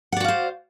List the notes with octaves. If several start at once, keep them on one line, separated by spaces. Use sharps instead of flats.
F#4 C5 D5 F5 F#5